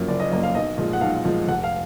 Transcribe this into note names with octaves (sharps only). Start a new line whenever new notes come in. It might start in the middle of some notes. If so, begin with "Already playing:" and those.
Already playing: F#2 F3 A#3
F#1 D5
D#5
F#2 F3 A#3 D#5
F5
B1 D#5
A#2 F3 G#3
F#5
B1 F5
A#2 F3 G#3
F1 F#5
F5